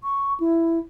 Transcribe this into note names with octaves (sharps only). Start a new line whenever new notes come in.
C#6
E4